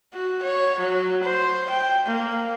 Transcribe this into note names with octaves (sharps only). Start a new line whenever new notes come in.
F#4
C#5
F#3
C5
G5
A#3